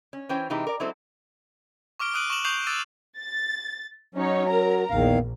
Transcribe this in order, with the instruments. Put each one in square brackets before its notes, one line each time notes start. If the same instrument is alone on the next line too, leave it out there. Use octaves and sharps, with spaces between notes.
[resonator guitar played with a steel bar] C#4
E3 C#4 C5 G5
C3 E3 G#3 D#4 E4 G4
A#4 D5
F#3 G#3 C4 E4 A4 C5
[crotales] C#6 D6 F6 D7 G7
D6 D#6 F#6 D7 D#7 F#7
C#6 D6 E7 F#7
C#6 D#6 G6 C7 F7 F#7
D6 E6 F#6 A6 D7 D#7
[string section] A6
[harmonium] F#3 [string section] C#4 D#4 C#5
[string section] A#4 A#5
[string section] A#1 [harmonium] E2 D#3 F5